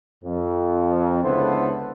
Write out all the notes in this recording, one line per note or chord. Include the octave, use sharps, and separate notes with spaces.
F2
C#2 D3 B3 E4 A4 C5